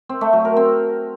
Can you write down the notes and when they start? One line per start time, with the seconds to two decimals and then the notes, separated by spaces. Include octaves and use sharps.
0.09 C4
0.21 A3
0.33 F#3
0.45 A#4
0.57 C4